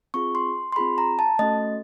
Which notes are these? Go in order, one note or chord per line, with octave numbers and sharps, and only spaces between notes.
C4 F4 G#4 C#6
C6
C6
C4 F4 G#4 B5
A#5
A5
A3 C#4 F#4 A4 D#5